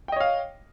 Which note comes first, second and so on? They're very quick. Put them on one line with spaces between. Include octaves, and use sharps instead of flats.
G5 D#5 C#5 F5